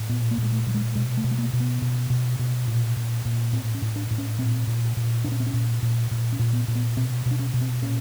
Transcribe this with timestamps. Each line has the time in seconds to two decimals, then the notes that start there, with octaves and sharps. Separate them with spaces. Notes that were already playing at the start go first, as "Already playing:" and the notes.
Already playing: A2
0.09 A#2 B3
0.31 A#3
0.38 A#2 G#3
0.52 A3
0.67 A#2 G3
0.74 G#3
0.95 B2 G#3
1.17 A3
1.24 B2
1.31 A3
1.38 A#3
1.53 B2
1.60 B3
1.82 B2
2.10 B2
2.39 B2
2.68 A#2
2.96 A#2
3.25 A#2
3.53 A2 C4
3.75 C#4
3.82 A2
3.96 D4
4.11 A2
4.18 C#4
4.38 A#2 C4
4.67 A#2
4.97 A#2
5.24 A#2 D4
5.32 C#4
5.40 C4
5.46 C#4
5.53 A#2
5.82 A#2
6.11 A#2
6.32 C#4
6.39 A#2
6.53 B3
6.68 A#2
6.75 B3
6.97 B2 C4
7.26 B2
7.31 D4
7.39 C#4
7.54 B2
7.61 C4
7.82 A#2 C#4